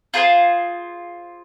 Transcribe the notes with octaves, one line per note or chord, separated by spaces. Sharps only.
F4 G#4 C5